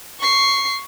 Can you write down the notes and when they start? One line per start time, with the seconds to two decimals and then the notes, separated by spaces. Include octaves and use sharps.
0.20 C#6 C7